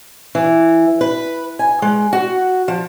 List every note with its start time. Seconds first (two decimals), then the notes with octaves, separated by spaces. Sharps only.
0.35 E3
1.01 B4
1.59 G#5
1.82 G#3
2.13 F#4
2.68 F3